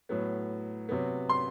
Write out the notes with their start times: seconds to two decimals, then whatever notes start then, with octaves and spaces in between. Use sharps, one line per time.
0.09 A2 F#3 B3
0.89 C3 F#3 B3
1.29 C6